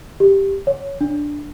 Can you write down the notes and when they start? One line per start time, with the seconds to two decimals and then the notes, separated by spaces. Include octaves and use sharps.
0.20 G4
0.67 C#5
1.01 D4